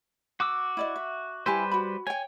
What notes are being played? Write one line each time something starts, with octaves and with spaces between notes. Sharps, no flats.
F#4 D6 E6
E4 D5 D#5
E5
G3 E4 G4 B4 C5 G#5
F#4 B5
C#5 G5 G#5